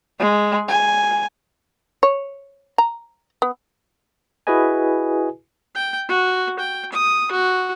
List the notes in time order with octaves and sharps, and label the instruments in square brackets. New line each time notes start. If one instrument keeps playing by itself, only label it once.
[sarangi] G#3
G#5
[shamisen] C#5
A#5
B3
[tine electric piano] E4 F#4 G#4 B4 D#5 G#5
[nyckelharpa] G5
F#4
G5
D#6
F#4